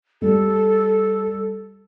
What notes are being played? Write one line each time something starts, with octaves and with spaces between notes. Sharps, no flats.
G3 A4